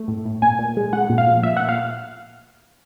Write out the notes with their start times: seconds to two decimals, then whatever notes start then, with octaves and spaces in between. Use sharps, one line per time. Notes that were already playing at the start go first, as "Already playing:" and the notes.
Already playing: A3
0.08 A2
0.25 A2
0.42 A#2 G#5
0.59 A#2
0.77 G#3
0.93 G#3 F#5
1.10 A#2
1.18 F5
1.27 F3
1.43 A#2 E5
1.57 F#5
1.60 A#2
1.69 F5